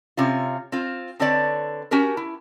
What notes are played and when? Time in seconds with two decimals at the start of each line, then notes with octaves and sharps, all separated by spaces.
0.17 C3 C#4 F4
0.72 C4 F4
1.20 D3 C4 B4 C#5 D5 A5
1.91 C#4 F#4 G4 A#4
2.17 E4